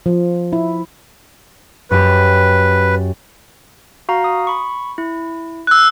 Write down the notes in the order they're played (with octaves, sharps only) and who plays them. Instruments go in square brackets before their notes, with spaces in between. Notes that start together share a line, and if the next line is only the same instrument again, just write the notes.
[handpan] F3
E4
[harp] F#2 G4 [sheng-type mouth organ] B4
[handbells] F#4 F5 A#5
D#6
B5 C#6
E4
[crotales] E6 F#6